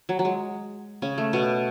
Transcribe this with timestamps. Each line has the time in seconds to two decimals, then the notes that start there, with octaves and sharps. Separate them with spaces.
0.09 F#3
0.19 F#3
0.25 G#3
1.02 C#3 C#4
1.18 A3
1.33 B2 B3